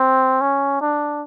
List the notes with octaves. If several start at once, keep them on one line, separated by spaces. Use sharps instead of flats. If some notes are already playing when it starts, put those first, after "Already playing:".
Already playing: C4
C#4
D4